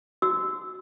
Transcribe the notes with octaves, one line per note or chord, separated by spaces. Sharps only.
F#4 E6